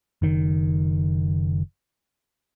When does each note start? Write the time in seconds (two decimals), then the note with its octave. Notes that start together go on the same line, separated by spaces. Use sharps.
0.22 F#1 D#3